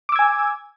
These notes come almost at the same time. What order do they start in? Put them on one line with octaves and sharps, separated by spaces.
D6 E6 G#6 G#5